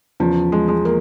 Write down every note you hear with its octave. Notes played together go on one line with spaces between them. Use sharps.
E2 C#3 F3
G#3
G#3
A#3